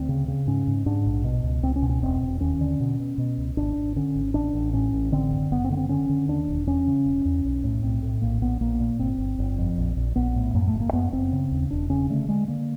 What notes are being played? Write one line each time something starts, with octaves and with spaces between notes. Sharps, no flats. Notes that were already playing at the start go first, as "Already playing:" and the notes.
Already playing: D2 C4
C#3
C#3
G#2 C#4
G#2
G#2 D4
A#1
B2
C#2
C#2 C4
C#4
B2
C#4
E1 C4
E1
D#2 C#4
D3
B2
B2
B2
C#2
G#1 D4
G#1
D3 C#4
G#1
A1 D4
A1
A2 C#4
A1
D3 C4
F#1
F#1 B3
C4
D3 B3
C4
D3 C#4
D3
D#2 D4
E1
E2 C#4
C#3
E1
E2
B1
A2
B1 C4
A2
A#1 A#3
A#1 B3
A#1 A#3
A#2
G1 C4
G1
G1
F2
A#1
A#1
A#1 B3
A2
F#2 A#3
A3
F#1
A#3
F#2 B3
F#1 C4
C#3
D#2
E1 D4
C#3 C#4
D3 A3
D3 G#3
D3 A#3